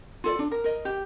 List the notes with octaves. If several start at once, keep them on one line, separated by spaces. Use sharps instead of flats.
F4 A4 D5
D4
A#4
A#4 D#5
G4